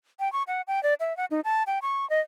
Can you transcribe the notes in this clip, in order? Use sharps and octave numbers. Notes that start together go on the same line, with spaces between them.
G5
C#6
F#5
G5
D5
E5
F#5
D#4
A5
G5
C#6
D#5